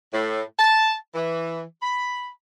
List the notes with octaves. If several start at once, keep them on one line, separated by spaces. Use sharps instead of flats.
A2
A5
E3
B5